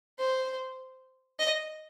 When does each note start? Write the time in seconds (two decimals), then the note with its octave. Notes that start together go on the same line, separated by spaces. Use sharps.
0.19 C5
1.39 D#5